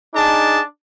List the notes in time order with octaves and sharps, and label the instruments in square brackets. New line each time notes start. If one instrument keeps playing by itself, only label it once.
[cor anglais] D4 [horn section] D#4 G#4 A5